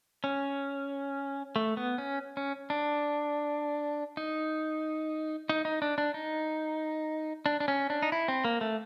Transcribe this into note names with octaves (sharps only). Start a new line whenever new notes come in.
C#4
A3
B3
C#4
C#4
D4
D#4
D#4
D#4
D4
D4
D#4
D4
D4
C#4
D4
D#4
E4
C4
A#3
A3